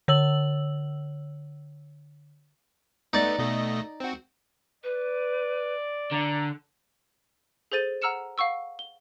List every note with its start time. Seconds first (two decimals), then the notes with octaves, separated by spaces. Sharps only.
0.08 D3 C#5 E6 F#7
3.13 A3 B3 D#4 D5
3.39 B2 A3 D#5
4.00 C4 F#4
4.84 B4 D5
6.11 D3 A#5
7.72 G#4 A4 C5 A6 D#7
8.02 F#5 A#5 E6 F6 C#7 E7
8.38 F5 F#5 C#6 E6
8.79 G7